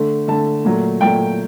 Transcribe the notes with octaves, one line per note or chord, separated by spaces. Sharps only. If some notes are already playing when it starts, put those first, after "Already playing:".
Already playing: D3 A3
D3 A3 A5
A#2 F#3 A3
A#2 F#3 A3 G5